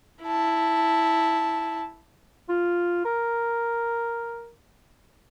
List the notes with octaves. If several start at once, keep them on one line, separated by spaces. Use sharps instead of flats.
E4 A5
F4
A#4